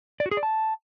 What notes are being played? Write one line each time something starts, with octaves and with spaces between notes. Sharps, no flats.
D5
F#4
G#4
D5
A5